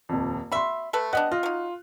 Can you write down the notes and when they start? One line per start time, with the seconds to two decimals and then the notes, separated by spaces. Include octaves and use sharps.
0.09 D#1 F2
0.52 F#4 E5 B5 C6
0.93 A3 A4 B4
1.13 G3 B3 D4 D#5 F#5 F#6
1.32 F4 D#5
1.43 F#3 D#4